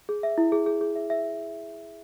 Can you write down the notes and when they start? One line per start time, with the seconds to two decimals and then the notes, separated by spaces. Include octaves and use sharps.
0.09 G#4
0.23 E5
0.38 E4
0.52 G#4
0.66 G#4
0.81 G#4
0.96 E5
1.10 E5